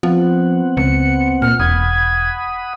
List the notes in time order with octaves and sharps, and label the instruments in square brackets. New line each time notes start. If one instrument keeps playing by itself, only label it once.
[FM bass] F3 [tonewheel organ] B3 C4 F#5
[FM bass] C#2 [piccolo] C#7
[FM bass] A#2 [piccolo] F6
[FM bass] E1 [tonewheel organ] F#5 B5 D#6 [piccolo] G#6